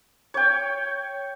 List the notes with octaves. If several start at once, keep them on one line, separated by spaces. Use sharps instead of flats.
C#5 G5